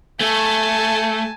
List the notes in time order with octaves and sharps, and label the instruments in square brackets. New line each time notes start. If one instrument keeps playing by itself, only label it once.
[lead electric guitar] A3 [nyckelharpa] G#5 A5